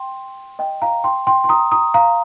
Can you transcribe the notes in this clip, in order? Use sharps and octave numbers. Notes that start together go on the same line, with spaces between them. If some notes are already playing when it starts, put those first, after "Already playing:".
Already playing: G5 C6
D#5 G5
F5 A#5
G5 C6
G5 C6
C6
A#5 D#6
A#5 D#6
F5 A#5